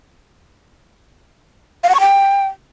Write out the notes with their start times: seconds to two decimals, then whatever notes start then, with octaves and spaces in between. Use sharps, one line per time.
1.84 F5
1.89 F#5
1.95 C#6
2.00 G5